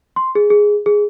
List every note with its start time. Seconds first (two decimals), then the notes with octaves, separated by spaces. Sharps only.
0.16 C6
0.35 G#4
0.50 G#4
0.86 G#4